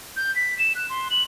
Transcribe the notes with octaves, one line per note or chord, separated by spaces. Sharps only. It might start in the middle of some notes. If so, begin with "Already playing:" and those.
G6
B6
E7
F#6
C6
F#7